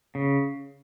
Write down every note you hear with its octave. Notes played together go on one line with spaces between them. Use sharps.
C#3